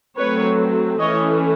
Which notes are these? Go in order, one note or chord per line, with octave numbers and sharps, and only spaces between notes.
F#3 A3 C4 B4 C#5
E3 A3 C#4 C#5 D#5